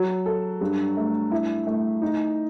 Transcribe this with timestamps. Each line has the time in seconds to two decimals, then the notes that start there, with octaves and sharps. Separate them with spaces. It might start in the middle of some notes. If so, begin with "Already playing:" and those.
Already playing: F#3
0.26 A4
0.61 G2
0.97 A3
1.32 E4
1.67 A3
2.02 D#4